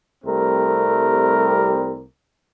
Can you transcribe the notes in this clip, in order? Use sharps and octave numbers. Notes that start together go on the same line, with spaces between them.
C2 G3 A3 C4 A#4